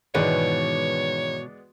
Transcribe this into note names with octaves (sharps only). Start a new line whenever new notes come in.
G#2 B2 D#3 E3 G#3 B3 C#5 D5